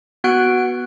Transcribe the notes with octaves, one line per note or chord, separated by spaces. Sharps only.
B3 F#4 F#5 F#6 D7